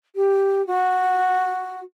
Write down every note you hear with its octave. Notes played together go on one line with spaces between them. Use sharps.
G4
F#4